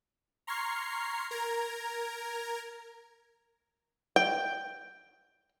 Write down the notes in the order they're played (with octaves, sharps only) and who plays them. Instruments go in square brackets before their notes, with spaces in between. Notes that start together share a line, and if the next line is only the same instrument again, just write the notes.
[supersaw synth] A#5 C6 C#6 F6 G#6 C7
A#4 A#5 G#6
[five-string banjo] G5